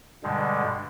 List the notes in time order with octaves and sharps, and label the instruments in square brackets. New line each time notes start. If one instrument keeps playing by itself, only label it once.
[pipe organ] G2 B2 D3 G3 G#3